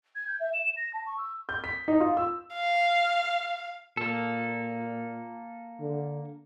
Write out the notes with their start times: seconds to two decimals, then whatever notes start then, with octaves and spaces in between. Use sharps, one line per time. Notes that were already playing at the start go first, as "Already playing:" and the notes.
0.15 G#6
0.27 G6
0.40 E5
0.53 E7
0.77 A#6
0.94 A5
1.06 C#6
1.18 E6
1.49 G6
1.64 B6
1.88 D#4
2.00 F4
2.17 E6
2.54 F5
3.97 A#2 A#3 A4
5.80 D3